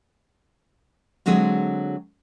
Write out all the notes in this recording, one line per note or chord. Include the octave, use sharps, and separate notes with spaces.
D3 F#3 G#3 C4 G#4